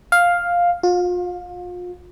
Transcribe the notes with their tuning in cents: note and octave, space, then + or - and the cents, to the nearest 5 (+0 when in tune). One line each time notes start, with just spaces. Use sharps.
F5 +5
F4 +35